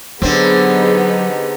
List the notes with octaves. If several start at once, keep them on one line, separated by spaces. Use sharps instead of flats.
D3 F#3 B3 C4 D4 D#4 G4 G#4